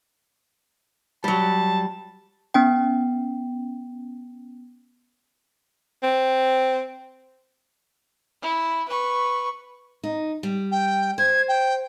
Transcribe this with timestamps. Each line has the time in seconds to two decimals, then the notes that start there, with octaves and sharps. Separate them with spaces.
1.24 F#3 G3 A5
2.54 B3 C#4 G5
6.03 C4
8.42 E4
8.89 B4 C#6
10.03 D#4
10.43 G3
10.72 G5
11.18 C5 G#6
11.48 G5